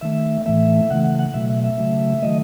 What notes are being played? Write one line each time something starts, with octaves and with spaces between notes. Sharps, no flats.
D#3 A3 E5
A2 E3 A3 E5
C#3 E3 A3 F#5
F#5
F#5
B2 F#3 A3 E5
E5
E5
C#3 F#3 A3
D#3 F#3 A3 D#5